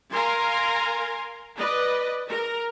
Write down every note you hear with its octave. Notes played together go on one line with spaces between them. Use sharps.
A#4 F5 G#5 A#5 C6
B4 D5 D#5
A#4